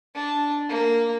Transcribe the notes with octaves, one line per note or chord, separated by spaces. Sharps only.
D4
A#3